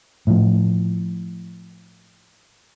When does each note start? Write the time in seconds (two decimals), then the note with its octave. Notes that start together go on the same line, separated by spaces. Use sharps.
0.27 A2 F3